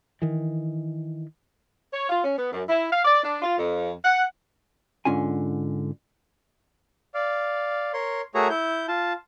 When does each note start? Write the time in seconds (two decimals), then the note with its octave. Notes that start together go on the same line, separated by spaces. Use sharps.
0.22 D#3 E3
1.93 C#5
2.09 F4
2.24 C#4
2.38 B3
2.52 F#2
2.69 E4
2.92 F5
3.05 D5
3.24 D4
3.42 F4
3.58 F2
4.05 F#5
5.05 G#2 D3 C#4 F4 G#5
7.14 D5 F5
7.93 A#4 C#5 C6
8.35 A3 F#4 G#4 A#4 C#5 A#5
8.50 E4 G6
8.88 F4 A5